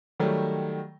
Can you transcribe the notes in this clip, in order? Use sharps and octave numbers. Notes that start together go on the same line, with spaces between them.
D#3 F#3 G3 A3